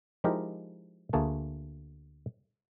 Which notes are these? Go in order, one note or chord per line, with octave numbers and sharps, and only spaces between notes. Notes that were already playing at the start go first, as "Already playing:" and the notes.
F3 G#3 D#4 E4 G4 A#4
D2 A3 A#3 G#4 A5